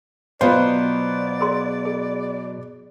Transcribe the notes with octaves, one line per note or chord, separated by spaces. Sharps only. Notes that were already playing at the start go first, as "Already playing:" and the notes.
B2 F#3 B3 F4 C5 D5
G#4 C6
G#4